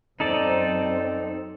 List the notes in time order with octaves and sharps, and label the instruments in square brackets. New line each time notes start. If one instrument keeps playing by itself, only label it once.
[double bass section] F#2 C4 [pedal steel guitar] D#4 A4 D5